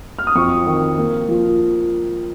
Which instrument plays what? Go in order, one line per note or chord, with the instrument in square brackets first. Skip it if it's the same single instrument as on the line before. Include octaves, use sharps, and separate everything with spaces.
[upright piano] F6
D#6
F2 C#6
D#3
A#3
F3